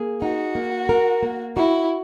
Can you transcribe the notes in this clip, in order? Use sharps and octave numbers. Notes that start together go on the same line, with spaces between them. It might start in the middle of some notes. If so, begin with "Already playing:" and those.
Already playing: A#3 G#4
D#4 F#4
A#3
A#4
A#3
E4 F#4